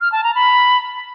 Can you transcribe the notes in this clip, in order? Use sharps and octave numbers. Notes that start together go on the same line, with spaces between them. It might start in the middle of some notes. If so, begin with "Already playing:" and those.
F6
A5
A#5
B5